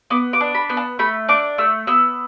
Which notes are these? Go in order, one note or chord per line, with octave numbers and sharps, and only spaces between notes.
B3 D6
D6
D4
B5
B3
A5
A3 B5
D4 D6
A3 E6
B3 E6